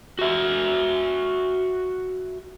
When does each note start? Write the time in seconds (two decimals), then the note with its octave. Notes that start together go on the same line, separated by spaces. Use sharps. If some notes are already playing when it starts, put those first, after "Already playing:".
0.19 F#4 E5